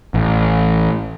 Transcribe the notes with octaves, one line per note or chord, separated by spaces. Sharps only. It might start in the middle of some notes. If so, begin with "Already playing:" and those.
A1